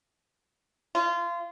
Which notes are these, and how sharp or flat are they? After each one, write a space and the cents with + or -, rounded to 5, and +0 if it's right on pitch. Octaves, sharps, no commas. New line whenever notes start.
F4 -25